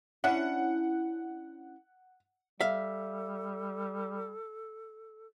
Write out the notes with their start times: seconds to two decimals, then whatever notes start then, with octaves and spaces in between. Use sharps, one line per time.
0.24 C#4 D4 E4 F#5
2.61 G3 A4 E5 F5